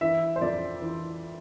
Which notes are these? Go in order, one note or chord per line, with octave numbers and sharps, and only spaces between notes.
E3 E5
C5
F2 D5
E3